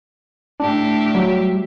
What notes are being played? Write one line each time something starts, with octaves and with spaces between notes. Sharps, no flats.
A2 D4 G4 E5
F#3 G3